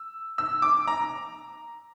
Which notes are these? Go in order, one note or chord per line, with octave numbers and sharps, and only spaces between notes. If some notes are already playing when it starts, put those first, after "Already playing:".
Already playing: E6
E6
D6
A#5